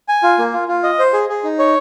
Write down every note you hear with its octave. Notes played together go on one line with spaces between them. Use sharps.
G#5
F4
A#3
F4
F4
D#5
C5
G#4
G#4
D#4
C#5